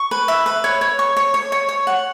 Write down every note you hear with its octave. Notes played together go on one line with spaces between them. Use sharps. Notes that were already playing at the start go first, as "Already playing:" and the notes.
Already playing: C#6
B4
E5
B4
C#5
C#5
C#6
C#5
C#5
C#5
C#5
F#5